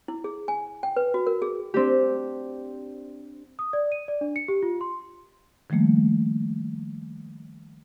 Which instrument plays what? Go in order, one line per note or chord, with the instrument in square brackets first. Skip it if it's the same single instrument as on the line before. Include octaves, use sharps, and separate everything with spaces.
[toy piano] E4
G#4
G#5
G5
B4
F#4
A#4
G#4
[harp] C4 D4 G4
[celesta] D#6
D5
D#7
D5
D4
C#7
G4
F4
C6
[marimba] D#3 F3 G3 A3 A#3